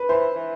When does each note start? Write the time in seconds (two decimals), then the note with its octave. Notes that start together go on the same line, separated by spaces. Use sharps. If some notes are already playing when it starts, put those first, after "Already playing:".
Already playing: B4
0.09 E3 C5
0.35 E3